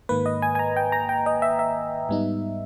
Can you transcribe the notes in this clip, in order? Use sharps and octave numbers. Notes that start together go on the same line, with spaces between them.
G#2 D#3 A#3 B4
D#5
G#5
G#5
A#5
G5
A#5
G5
D#5
E5
E5
G#2 G3 B3 D#4